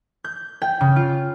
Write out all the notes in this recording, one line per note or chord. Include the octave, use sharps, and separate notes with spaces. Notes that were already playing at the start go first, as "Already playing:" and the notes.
G6
G5
C#3
F4